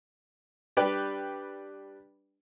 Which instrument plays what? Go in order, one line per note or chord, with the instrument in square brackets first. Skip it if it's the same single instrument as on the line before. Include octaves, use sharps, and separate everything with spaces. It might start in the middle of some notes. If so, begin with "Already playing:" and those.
[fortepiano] G3 D4 G4 B4 D5 G5